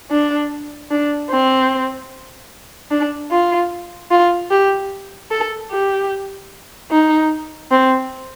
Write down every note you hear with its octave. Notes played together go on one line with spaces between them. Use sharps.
D4
D4
C4
D4
F4
F4
G4
A4
G4
D#4
C4